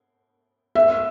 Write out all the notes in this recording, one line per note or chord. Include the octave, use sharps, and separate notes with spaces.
E5